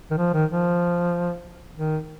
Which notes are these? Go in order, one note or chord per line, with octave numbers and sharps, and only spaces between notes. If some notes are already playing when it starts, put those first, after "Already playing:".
D#3
F3
D#3
F3
D#3